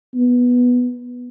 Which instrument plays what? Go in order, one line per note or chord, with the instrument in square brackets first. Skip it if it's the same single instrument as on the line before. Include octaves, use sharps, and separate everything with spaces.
[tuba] B3